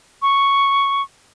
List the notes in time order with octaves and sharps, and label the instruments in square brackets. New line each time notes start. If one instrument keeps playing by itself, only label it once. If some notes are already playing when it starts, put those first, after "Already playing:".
[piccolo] C#6